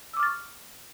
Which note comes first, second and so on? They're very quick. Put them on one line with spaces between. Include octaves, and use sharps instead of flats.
E6 D6 F6 A6 C#6